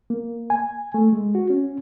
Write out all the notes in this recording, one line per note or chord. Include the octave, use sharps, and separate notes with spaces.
A#3
G#5
A3
G#3
F#4
C#4